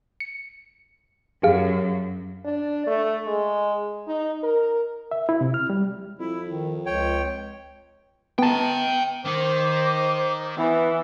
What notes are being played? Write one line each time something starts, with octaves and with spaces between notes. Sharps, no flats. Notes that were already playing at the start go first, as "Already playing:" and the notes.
C#7
F#2 G4 G#4 F5
D4
A3
G#3
D#4
A#4
E5
E4
C3
F6
G3
F2 E4
D#3
C#2 C#5 G5
B3 G5 A5 A#5
D#3 D#4 C5 D6
E3 B3 B4